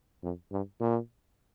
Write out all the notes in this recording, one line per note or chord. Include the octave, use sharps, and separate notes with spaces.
F2
G2
A#2